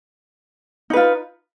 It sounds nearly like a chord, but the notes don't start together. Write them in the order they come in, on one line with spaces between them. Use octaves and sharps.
D#4 B4 F4